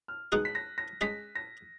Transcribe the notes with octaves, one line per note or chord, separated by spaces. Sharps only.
F6
B2 G#3 D#4 G#4 F#6
B6
A#6
A#6
G#3 C#4 G#4 B6
A#6